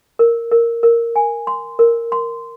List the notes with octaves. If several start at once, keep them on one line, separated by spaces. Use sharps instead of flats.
A#4
A#4
A#4
G#5
C6
A#4
C6